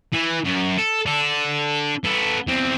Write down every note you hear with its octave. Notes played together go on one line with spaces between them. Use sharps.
E3
F#2
A4
D4 A4
B3 A4
E2 C4